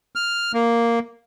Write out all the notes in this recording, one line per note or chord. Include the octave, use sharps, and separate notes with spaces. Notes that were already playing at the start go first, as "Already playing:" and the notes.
F6
A#3